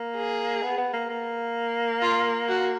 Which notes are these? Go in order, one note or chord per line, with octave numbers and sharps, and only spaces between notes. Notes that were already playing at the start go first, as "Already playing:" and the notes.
Already playing: A#3
G#4
B3
B3
A#3
A#3
F4
F#4